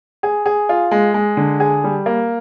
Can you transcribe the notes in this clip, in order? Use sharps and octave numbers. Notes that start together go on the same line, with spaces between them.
G#4
G#4
F4
G#3
G#3
D3
G#4
G3
A#3